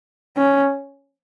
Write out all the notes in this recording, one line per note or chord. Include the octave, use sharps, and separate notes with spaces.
C#4